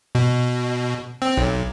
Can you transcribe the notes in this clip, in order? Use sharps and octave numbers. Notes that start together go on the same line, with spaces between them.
B2
C4
B1